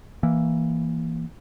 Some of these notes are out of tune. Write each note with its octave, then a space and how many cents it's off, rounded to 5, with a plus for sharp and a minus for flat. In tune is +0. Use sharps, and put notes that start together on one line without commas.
E3 +0 A#3 +0